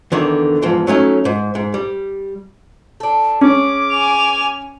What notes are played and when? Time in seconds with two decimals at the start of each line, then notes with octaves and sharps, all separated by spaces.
0.12 E2 D3 D#3
0.62 E2 G#2 F3
0.87 F#3 A3 C#4 D#4
1.25 G#2
1.55 G#2
1.74 G3
3.00 D4 A4
3.41 C#4 G#4 D6
3.92 G#5 F7